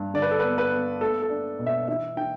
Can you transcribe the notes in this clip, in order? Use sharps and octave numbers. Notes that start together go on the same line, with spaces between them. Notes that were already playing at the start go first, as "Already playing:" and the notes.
Already playing: G2
D3 D5
B4
A4
B3 B4
B4
B3
A3 A4
A4
D4
B2
E5
E3 E5
E3 G5